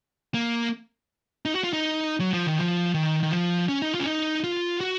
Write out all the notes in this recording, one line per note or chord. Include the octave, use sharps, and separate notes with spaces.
A#3
D#4
F#4
F4
D#4
F#3
F3
D#3
F3
D#3
D#3
F3
C#4
D#4
F4
C#4
D#4
F4
F#4